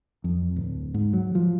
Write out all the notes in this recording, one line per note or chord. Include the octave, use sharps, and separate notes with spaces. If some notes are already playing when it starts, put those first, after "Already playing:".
F2
D1
G#2
F#3
F3